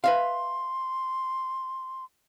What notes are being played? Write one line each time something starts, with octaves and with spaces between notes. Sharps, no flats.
B4 E5 F5 C6